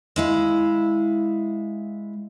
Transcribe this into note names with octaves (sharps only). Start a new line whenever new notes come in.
G#3 E4 F5